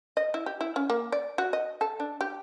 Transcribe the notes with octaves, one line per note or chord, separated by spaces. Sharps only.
D#5
E4
G4
E4
C#4
A#3
D5
F#4
D#5
A4
D4
G4